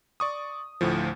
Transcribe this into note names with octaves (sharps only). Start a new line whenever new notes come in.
D5 C#6 D#6
D2 A2 F3